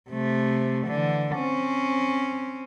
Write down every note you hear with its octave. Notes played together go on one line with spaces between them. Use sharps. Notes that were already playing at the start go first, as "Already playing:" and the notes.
C3 A3
D3 E3
C4 C#4